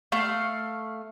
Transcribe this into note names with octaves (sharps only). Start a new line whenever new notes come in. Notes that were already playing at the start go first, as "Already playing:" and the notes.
A3 F5